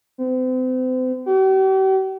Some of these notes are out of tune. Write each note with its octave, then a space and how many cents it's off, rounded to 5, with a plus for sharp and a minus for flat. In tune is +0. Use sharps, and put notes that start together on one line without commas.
C4 -40
G4 -45